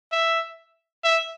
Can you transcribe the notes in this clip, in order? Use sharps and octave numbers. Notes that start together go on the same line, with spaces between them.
E5
E5